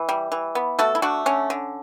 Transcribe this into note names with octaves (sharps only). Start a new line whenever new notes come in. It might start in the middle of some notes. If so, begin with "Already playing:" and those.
Already playing: E3
G3
E3
B3
A3 F#4 A4
E4
A3 D4 F#4
D3 C#4
D3